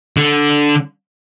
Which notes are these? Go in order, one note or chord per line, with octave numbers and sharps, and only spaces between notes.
D3